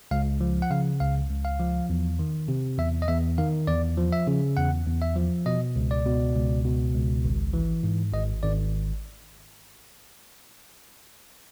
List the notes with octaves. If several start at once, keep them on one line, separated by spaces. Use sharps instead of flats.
C#2 F5
F3
F#5
C#3 F5
C#2 F5
C#2
F5
F3
E2
D#3
C3
E2 E5
D#5
E2 E5
D#3 F5
E2 D5
F3
E5
C#3
E2 F#5
E2
E5
F3
B2 D#5
C#2
D5
B2
C#2
B2
C#2
G#1
E3
G#2
G#1 D#5
G#1 D5